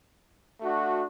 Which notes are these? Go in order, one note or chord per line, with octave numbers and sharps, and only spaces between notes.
A3 D4 F#4